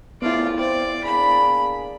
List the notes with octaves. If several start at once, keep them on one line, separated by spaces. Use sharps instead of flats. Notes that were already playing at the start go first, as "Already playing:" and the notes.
C2 C#3 A3 B3 E4 F4 D5
A1 C4 C5 D5
A#3 D4 G#4 B5